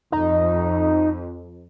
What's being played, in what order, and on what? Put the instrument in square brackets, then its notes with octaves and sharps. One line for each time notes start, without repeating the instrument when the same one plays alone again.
[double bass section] F2 [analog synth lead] D#4